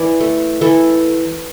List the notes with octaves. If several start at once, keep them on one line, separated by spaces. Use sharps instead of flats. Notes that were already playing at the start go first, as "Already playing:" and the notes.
Already playing: E3 D5
A3
E3 A4